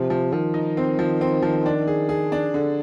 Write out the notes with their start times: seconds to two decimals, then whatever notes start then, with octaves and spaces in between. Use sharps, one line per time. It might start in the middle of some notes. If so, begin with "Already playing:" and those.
Already playing: C3 F3
0.10 F3
0.32 D#3 F3
0.54 D#4
0.77 C4
0.99 F3
1.21 C4
1.42 F3
1.66 D4
1.88 G#4
2.09 G#4
2.32 D4
2.54 D3